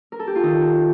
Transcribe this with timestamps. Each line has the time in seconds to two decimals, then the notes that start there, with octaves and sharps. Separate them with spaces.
0.12 A#4
0.19 A4
0.27 G4
0.35 F4
0.43 D#3 D#4